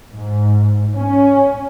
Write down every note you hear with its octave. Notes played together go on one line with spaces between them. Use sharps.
G#2
C#4